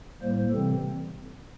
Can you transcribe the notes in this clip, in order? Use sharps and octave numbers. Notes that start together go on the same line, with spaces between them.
A2 G3 A#3 C5
C3 E3 G3 C4 A4